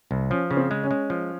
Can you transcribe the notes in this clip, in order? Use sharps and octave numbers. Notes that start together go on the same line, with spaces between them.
C2
F3 C#4
C#3 C#4
C4
G#3
C#4
G#3
F3